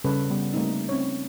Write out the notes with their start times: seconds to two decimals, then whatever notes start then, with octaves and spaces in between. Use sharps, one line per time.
0.04 C#3 G3 C#4 A4 B4 C#5
0.30 G3 B3
0.54 G3 A3 A#3 C4 D#4
0.89 C4 C#4 C#5